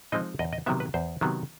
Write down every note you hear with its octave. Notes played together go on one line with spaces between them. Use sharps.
F3 G#3 C4 D#4 D#5
E2 D#5
D#5
C3 D#3 F#3 B3 E5
B4
E2 C5
C3 D#3 F#3 B3